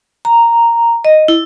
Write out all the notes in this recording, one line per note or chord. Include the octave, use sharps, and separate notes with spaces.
A#5
D#5
E4